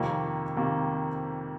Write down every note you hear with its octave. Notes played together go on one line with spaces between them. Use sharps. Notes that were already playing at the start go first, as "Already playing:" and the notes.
Already playing: F2 C3 D#3 A#3
C3 D#3 A#3